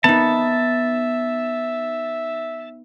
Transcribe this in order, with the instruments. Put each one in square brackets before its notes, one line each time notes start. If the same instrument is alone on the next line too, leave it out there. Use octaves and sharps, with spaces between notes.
[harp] B3 D#4 [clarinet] E5 [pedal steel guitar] A5